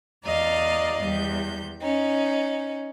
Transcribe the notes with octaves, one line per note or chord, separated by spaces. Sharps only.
E2 D5 D#5 F5 A#5
E2 G3 G6
C#4 D#4